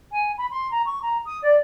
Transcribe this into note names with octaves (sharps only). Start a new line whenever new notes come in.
G#5
B5
C6
A#5
C#6
A#5
D#6
D5